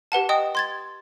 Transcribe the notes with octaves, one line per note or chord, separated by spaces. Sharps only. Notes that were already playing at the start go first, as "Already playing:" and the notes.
G4 B4 F#5 A5
D#5 G5 D#6
C6 G#6 A6